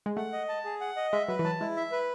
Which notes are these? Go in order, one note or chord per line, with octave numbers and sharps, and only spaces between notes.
G#3
A3 F#5
D#5
A5
G#4
F#5
D#5
G#3 E5
F#3 B4
E3
F#3 A5
G#3 E4
E5
B4